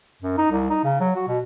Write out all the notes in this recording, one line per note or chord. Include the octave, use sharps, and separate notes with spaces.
F#2
D#4
C2
D#4
C#3
F#3
F#4
B2